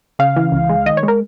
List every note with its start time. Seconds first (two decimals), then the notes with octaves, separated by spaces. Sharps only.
0.19 C#3 F5
0.37 E3
0.52 C#2
0.69 G#3
0.86 D#3 D#5
0.97 C#5
1.03 G#3
1.08 A#4